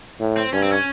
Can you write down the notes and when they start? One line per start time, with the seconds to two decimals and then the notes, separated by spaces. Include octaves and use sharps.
0.20 A2
0.37 C4
0.53 G2 C#4
0.63 C4
0.72 C#4